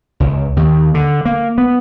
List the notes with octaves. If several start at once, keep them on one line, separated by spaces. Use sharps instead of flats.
C#2
D#2
D3
A#3
B3